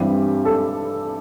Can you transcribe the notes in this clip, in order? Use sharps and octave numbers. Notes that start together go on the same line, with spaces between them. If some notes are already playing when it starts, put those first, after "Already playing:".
Already playing: G2 E3 G3 C4 G4
A4